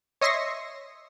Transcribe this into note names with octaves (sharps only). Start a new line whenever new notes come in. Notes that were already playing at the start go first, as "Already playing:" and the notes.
C#5 D#5 E5 C6 C#6 A#6